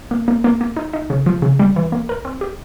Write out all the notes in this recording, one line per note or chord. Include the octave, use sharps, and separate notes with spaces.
A#3
A#3
A#3
A#3
D#4
D#4
C#3
F3
C#3
G3
E3
A#3
A#4
C4
G4